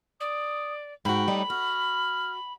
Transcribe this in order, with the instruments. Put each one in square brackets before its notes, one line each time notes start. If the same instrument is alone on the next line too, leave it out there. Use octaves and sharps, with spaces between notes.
[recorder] D5 [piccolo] D#6
[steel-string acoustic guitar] G#2 F#4 [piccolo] G5 [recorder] B5
[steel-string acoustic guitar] A2 G3 D#4
[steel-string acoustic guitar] F#4 [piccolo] F6